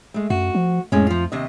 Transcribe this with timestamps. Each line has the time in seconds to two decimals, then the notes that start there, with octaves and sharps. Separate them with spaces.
0.14 G#3 A3
0.30 F#2 F#4
0.55 F3
0.92 F2 A2 G#3 C#4
1.07 F3 F4
1.32 D#2 C3 D#5